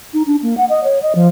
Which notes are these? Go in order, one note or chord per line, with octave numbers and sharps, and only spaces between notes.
D#4
D4
A#3
F#5
D#5
C#5
D#5
F3